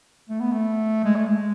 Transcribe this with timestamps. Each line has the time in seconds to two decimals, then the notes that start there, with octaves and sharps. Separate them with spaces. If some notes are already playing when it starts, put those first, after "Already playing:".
0.29 A3
0.40 B3
0.52 A3
1.04 G#3
1.16 A3
1.28 G#3